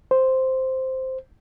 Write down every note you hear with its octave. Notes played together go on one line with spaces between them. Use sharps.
C5